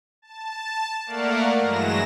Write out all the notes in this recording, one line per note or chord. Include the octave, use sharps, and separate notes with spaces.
A5
A3 A#3 A#4 D5 F5 F#5
G2 E3 F#3 G#3 A#6 E7